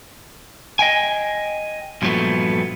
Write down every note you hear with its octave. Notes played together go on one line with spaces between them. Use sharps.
D#5 G5 G#5
G2 A#2 F3 F#3 A3 B3